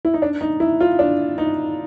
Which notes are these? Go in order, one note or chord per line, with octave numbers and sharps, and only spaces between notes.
E4
D#4
D4
D#4
E4
F4
D4
D#4